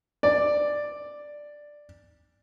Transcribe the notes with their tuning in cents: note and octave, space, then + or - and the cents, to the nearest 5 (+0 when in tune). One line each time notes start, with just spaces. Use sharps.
D5 +5